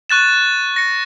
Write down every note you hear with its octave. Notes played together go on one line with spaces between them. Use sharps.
C#6 F#6 A6 E7
A#6 C#7